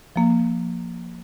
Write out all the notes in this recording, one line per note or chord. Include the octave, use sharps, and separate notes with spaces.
F3 A#3